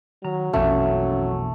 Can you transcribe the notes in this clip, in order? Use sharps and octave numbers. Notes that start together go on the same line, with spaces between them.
D#3 F#3 A#5
A#1 F2 B2 E3 A3 A#3 C#4